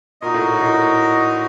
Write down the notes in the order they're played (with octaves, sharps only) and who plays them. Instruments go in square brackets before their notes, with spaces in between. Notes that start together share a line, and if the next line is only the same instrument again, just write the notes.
[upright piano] A#2 [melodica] D#4 F#4 A#4 D#5
[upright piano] A2
A2